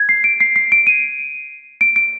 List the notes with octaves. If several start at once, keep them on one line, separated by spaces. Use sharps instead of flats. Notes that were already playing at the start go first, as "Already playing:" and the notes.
Already playing: G#6
C7
D7
C7
C7
D7
D#7
D7
D7